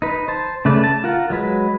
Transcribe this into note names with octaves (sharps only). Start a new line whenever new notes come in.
D#4 B4
C5 A5
C#3 A3 B4 D5
A5
F4 A#4 F#5
F#3 G#3 B4